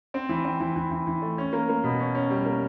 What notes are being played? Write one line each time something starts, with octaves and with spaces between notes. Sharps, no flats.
C4
E3
C4
E3
E3
E3
E3
A3
C#4
A#3
A#3
B2
C#4
C#4
G3
A#3